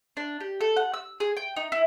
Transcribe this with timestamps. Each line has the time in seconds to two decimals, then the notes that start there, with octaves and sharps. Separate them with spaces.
0.17 D4
0.40 G4
0.61 A4
0.76 F#5
0.94 E6
1.20 G#4
1.37 G5
1.56 D#4
1.72 E4